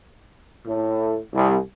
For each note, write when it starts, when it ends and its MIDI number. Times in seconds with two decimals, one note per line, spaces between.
0.66 1.19 45
1.34 1.58 36